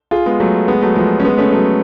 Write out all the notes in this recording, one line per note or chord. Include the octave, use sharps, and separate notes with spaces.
F4 G#4
G#3 B3
F#3 A3
G#3 B3
F#3 A3
F3 G#3
C#4
G#3 B3
A3 C#4
F#3 A3